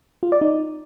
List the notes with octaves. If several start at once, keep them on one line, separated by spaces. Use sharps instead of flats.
F4
D5
D#4